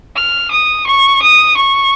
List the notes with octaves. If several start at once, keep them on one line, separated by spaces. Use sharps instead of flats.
F6
D#6
C#6
D#6
C#6